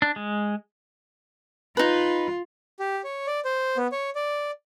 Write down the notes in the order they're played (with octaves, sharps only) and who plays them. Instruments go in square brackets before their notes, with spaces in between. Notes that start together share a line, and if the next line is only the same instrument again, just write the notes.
[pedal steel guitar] D4
G#3
[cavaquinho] D#4 B4 [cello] F4
[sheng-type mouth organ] G4
C#5
D5
C5
B3
C#5
D5